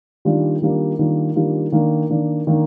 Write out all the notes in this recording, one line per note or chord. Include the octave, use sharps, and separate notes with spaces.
D#3 G3 A#3 D4 F4
D#3 G3 A#3 D4 F4
D#3 G3 A#3 D4 F4
D#3 G3 A#3 D4 F4
D#3 A#3 D4
D#3 A#3 D4
D#3 A#3 D4